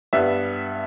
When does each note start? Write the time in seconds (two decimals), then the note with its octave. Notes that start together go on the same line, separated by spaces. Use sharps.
0.13 G2 G3 B3 E5